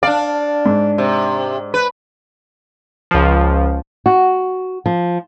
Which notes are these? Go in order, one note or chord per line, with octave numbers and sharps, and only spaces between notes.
D4 D5 F5
G#2
C3
B4
C#2 F3
F#4
F3